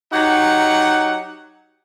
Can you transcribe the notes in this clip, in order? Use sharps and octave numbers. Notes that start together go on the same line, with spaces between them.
F#3 D#4 G4 F#5